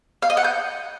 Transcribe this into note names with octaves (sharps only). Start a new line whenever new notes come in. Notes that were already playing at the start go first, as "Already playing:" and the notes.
F5
D#5
F#5
G6